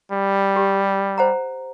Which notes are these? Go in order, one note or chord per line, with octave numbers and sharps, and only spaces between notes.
G3
G4
C5 F#5 A#5